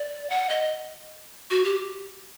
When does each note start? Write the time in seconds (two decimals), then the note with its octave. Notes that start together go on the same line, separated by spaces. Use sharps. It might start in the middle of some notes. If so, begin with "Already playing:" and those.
Already playing: D5
0.30 F#5
0.50 D#5
1.51 F#4
1.65 G4